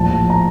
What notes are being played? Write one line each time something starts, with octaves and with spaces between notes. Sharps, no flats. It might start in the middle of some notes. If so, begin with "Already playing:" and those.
Already playing: A#1 A2 F3 A5
A#5